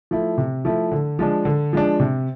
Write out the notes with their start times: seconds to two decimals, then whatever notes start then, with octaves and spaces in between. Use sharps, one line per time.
0.11 F3 A3 E4
0.38 C3
0.65 F3 A3 E4
0.92 D3
1.19 F3 G#3 D4
1.45 D3
1.73 F3 G#3 D4
2.00 C3